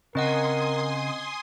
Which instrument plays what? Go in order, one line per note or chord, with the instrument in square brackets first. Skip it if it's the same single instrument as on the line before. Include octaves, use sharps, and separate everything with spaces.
[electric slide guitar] C#3 [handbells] C4 D#5 F#5 [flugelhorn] A#4 [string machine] G#5 C6 D#6